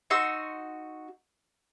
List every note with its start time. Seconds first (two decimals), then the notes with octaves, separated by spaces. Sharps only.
0.10 D#4 F#4 C6 E6